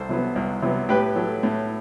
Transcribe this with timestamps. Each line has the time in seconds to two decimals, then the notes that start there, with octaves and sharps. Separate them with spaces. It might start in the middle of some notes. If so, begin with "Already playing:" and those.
Already playing: C2 A4 C5
0.09 C3 F#3 B3
0.36 C2
0.62 C3 F#3 B3
0.89 A2 G4 B4
1.16 F#3 A3
1.43 A2